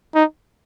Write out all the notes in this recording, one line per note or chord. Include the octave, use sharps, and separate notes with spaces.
D#4